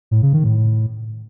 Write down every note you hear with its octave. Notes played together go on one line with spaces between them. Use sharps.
A2
C#3
D#3
A2